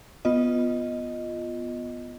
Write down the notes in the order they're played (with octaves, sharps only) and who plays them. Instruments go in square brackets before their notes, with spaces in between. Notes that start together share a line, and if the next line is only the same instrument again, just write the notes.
[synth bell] B3 F4 D#5